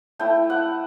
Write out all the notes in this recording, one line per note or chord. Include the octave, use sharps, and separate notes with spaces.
A3 E4 G5
F#5